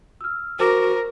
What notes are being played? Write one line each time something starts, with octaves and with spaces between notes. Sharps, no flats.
E6 F6
F#4 A#4 C5 D6